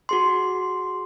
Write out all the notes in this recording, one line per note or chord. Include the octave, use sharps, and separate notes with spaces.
F#4 G#4 C6